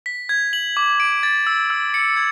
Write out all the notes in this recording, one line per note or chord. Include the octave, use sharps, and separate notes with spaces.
B6
G#6
F#7
D6
D7
A6
E6
E6
C#7
G#6